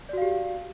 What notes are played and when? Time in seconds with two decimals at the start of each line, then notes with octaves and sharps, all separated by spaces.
0.09 D5
0.13 F#4
0.18 F5
0.22 G4